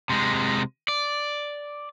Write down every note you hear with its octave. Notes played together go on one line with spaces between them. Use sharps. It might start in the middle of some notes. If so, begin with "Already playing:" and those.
C3 G#3
D5